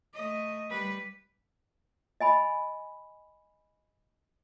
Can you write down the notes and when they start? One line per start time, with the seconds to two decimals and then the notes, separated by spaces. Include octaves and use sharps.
0.14 A3 D#5
0.70 G3 B4
2.20 D#5 G#5 B5